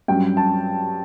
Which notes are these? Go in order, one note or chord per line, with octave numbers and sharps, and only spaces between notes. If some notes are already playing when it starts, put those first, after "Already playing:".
G2 F#3 C#4 G5
A5